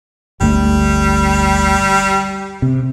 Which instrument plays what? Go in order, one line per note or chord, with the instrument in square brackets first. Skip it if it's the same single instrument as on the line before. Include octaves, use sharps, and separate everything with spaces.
[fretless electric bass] G1 D2 A3 [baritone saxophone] G3
[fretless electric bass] C3